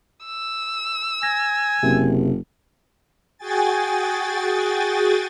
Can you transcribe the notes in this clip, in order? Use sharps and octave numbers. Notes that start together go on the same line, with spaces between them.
E6
G#5 A#6
F#1 C3
F#4 G#4 G5 G#5 A6